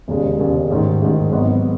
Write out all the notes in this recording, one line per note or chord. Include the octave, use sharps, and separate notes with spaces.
E1 D#2 C#3 G#3
E1 D#2 C#3 G#3
A1 G#2 D#3
A1 G#2 D#3
G#1 G#2 F#3 B3 F#4